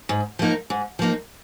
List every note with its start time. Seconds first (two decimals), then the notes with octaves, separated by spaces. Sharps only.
0.09 G#2
0.39 F3 A#3 D#4
0.70 G#2
0.99 F3 A#3 D#4